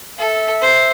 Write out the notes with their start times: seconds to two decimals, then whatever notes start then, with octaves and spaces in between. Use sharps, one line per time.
0.19 A4 E5
0.62 C5